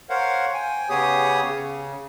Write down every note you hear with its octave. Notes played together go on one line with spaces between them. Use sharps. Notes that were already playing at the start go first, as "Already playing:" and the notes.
A#4 C5 C#5 F5 F#5
G5 G#5
C#3 B3 G4 G#4 C#5 D#6
C#3